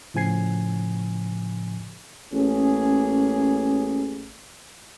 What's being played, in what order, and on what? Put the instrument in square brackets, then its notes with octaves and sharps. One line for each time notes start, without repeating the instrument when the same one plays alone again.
[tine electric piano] A2 C#3 F3 G#5 G#6 C7
[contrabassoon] A1 [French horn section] A#3 C#4 G#4